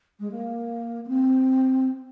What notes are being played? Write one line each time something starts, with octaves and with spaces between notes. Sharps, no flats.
G#3
A#3
A#3
C4